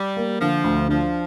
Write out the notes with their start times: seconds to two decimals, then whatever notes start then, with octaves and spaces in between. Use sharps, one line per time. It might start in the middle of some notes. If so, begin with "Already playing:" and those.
Already playing: G3
0.17 A#3
0.40 D3 F3
0.64 D2
0.89 F3 D4